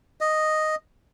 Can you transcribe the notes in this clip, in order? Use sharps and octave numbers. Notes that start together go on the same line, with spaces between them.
D#5